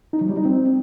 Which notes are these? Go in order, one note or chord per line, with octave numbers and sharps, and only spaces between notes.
D#4
F#3
G3
D#4
C4